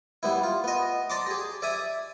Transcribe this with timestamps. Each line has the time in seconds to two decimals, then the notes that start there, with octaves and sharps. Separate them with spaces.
0.23 G3 B3 E4
0.43 F4
0.64 B3 D#5
1.10 D5 A5 A#5 C6 D6
1.26 G4 G#4
1.62 D5 E5 G#5 D#6